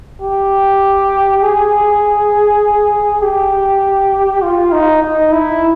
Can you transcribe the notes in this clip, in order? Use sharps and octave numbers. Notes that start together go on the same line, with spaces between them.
G4
G#4
G4
F4
D#4
D#4
E4